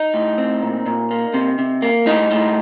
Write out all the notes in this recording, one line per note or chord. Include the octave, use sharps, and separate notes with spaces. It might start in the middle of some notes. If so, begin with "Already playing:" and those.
Already playing: D#4
A2
C4
A#2
A#2
A#3
C3
C3
A#3
A2 D#4
A2